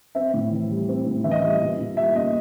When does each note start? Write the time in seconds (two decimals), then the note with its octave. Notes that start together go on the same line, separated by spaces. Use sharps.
0.15 C4 E5
0.34 A2
0.52 E3
0.70 G3
0.89 C4
1.06 A2
1.24 E3 E5
1.31 D#5
1.39 G3 E5
1.61 A#2
1.79 A#2
1.97 G3 E5
2.15 A#3 D#5